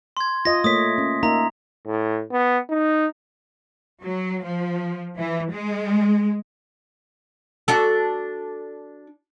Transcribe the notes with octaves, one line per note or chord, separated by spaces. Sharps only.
C6 G#6
F4 D#5 A#6
A3 A#3 C#5 D#6 B6
C#4
A#3 D#4 E5 A#5
A2
B3
D#4
F#3
F3
E3
G#3
D4 F#4 A4